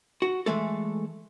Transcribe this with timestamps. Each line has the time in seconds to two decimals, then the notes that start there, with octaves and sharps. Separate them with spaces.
0.22 F#4
0.46 E3 G#3 A3 A4